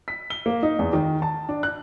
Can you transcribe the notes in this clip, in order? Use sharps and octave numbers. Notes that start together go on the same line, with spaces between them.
B6
G7
A#3
D#4
E2
D#3
A5
D4
F#6